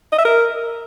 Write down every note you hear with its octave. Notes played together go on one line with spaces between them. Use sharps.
D#5
E5
A#4